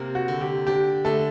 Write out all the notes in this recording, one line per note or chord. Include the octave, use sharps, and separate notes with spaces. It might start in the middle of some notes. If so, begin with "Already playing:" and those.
Already playing: C3 A#3
F#4
D3
G4
D4 G4
D3 A3 A4